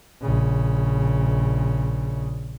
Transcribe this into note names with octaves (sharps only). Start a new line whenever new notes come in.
A#1 C#3